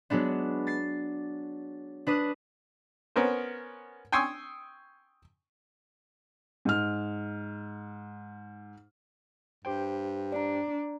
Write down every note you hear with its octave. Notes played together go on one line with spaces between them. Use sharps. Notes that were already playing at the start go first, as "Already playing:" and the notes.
F#3 G#3 B3 D4
A6 C7
D4 B4 D#6
B3 C#4 A#4 C5
G5 G#5 C6 C#6 D#6 E6
G#2 F6
G2 G4 C5 G5
D4 D5 A#5